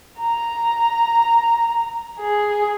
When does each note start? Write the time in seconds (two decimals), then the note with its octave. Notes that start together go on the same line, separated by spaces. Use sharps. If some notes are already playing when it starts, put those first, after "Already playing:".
0.20 A#5
2.20 G#4